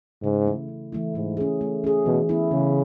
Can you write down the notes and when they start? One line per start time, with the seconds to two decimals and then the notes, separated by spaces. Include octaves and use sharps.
0.23 G#2 C#3
0.46 E3 A3 E4
0.68 C#3
0.92 E3 A3 E4
1.14 G#2 A3
1.37 C#4 G#4
1.61 A3
1.84 C#4 G#4
2.05 B2 E3
2.29 B3 E4
2.51 C#3 E3